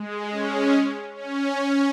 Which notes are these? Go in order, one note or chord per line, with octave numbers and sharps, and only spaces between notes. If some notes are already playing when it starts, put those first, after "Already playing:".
Already playing: G#3
C#4
C#4
C#4